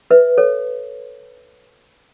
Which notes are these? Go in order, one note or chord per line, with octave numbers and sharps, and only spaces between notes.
B4 E5
A4 C#5